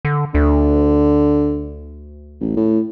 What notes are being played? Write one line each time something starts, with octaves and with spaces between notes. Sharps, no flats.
D3
D2 D3
A1
A2